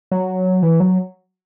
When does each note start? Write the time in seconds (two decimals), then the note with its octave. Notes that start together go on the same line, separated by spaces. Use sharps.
0.11 F#3
0.62 E3
0.80 F#3